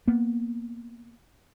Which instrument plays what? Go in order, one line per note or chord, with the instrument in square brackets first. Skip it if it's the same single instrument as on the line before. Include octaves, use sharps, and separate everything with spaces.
[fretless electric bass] A#3 B3